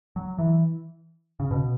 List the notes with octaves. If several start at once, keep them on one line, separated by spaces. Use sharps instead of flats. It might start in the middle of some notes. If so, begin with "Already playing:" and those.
F#3
E3
C#3
B2